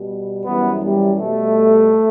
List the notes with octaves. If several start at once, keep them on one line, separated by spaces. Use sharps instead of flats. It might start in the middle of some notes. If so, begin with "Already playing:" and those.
Already playing: B2 G3
F#2 E3 G3 B3
G3
B2 G3 A3